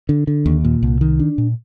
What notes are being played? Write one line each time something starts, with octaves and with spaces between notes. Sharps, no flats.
D3
D3
D#2
A#2
C2
D#3
D4
A#2